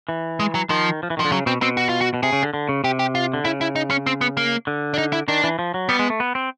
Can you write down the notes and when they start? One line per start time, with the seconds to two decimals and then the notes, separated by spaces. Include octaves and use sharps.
0.09 E3
0.40 G#3
0.55 F#3
0.70 D#3 F3
1.03 F3
1.10 E3
1.17 D#3
1.20 D3 F3
1.31 C#3 F#3
1.46 B2 C4
1.61 B2 C4
1.77 F#4
1.89 F4
2.01 F#4
2.14 B2
2.23 C3 G#4
2.33 C#3
2.43 D3
2.54 D3
2.69 C#3
2.84 C3 G4
2.99 G4
3.15 F4
3.34 D3
3.45 C#3 E4
3.61 E4
3.76 D#4
3.90 C#4
4.07 C4
4.21 B3
4.37 A#3
4.67 D3
4.94 D4
4.98 D#4
5.13 E4
5.28 D#3 D4
5.44 E3
5.59 F3
5.74 F#3
5.89 G3 B3
5.99 G#3
6.10 A3
6.20 B3
6.35 C4